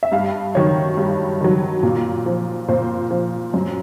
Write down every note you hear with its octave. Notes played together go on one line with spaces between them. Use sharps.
E5
G2 F5
D#3 F#3 C#5
G2
D#3 F#3
A#2
F3
A#2 C5
F3
F#2